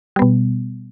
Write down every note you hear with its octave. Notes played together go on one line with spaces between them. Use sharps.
B2 G3 B3